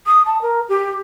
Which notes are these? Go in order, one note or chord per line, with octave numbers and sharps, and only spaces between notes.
D#6
A5
A#4
G4